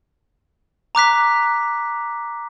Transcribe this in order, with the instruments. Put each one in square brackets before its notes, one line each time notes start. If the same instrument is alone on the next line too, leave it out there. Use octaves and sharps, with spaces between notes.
[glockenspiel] A#5 D6 F#6 B6